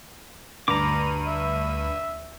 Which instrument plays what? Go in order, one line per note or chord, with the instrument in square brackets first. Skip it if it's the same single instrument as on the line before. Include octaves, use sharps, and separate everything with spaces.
[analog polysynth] D2 D#7 [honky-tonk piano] G2 [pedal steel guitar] A#5 D6
[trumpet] E5